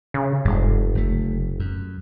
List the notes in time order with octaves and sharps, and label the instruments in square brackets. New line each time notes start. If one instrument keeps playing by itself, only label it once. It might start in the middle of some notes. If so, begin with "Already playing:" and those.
[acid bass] C#3
[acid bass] F1 [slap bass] G2 C3 G#3
[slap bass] F#1 A3
F#2